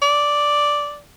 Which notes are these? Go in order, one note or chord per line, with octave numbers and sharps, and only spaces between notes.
D5